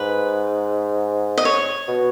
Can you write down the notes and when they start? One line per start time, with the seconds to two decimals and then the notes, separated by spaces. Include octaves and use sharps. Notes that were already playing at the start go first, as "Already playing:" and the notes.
Already playing: G#2 B4
1.37 D#5
1.45 C#5
1.88 B2